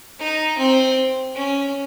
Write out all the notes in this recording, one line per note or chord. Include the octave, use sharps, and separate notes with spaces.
D#4
C4
C#4